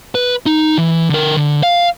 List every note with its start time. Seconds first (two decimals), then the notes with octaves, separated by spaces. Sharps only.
0.15 B4
0.46 D#4
0.78 E3
1.10 D3 A#4
1.37 D3
1.63 F5